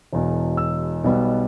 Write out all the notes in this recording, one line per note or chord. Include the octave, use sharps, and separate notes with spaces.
E1 E2 B2
E6
B1 B2 G3 B3